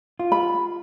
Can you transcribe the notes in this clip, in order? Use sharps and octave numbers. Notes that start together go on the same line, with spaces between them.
F4
B5